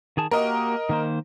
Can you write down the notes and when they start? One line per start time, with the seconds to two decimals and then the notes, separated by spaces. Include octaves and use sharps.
0.17 D#3 G#4 A5
0.31 A#3 F#4 G4 A#4 D#5
0.89 D#3 A#3 C5